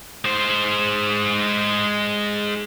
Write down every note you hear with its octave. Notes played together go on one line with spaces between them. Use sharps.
G#3 C5